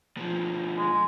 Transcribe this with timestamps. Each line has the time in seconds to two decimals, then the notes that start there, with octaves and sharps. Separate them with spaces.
0.17 B2 F3
0.78 G#3